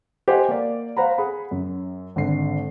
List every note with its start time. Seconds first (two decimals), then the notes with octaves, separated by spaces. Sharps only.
0.28 G4 C5 D#5 F#5 G#5
0.48 A#3 D5
0.97 C5 F5 F#5 A#5 B5
1.18 G#4 F#5 B5
1.51 F#2
2.16 G#1 D3 C7